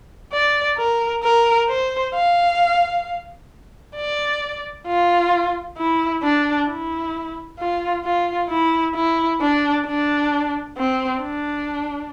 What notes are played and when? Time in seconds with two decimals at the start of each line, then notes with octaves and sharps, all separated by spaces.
0.33 D5
0.78 A#4
1.24 A#4
1.69 C5
2.14 F5
3.96 D5
4.87 F4
5.78 E4
6.24 D4
6.69 E4
7.59 F4
8.05 F4
8.50 E4
8.95 E4
9.41 D4
9.86 D4
10.77 C4
11.22 D4